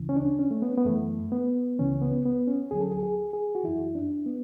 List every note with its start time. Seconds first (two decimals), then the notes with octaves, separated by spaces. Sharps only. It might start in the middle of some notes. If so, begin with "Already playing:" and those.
Already playing: D2 C#3 E3
0.09 C#4
0.16 D4
0.39 C#4
0.51 A3
0.62 B3
0.77 B3
0.85 F#2 E3 A3
1.32 B3
1.79 C#2 C#3 E3 C#4
2.01 B3
2.25 B3
2.47 C#4
2.71 D2 D3 F#3 G#4
2.81 A4
2.92 G#4
3.03 G#4
3.33 G#4
3.55 F#4
3.64 F#2 E3 E4
3.95 D4
4.26 B3